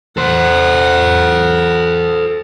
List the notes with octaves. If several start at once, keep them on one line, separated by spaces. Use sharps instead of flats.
A4 C5 F#5